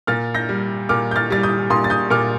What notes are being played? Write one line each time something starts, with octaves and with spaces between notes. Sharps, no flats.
A#2 F6 A6
G6 A#6
G3
A#2 D6 F6
G6
F6 A6
G3 A6
D#6 G6
A#2 C6 D#6
A6
D#6 G6
A#2 D6 F6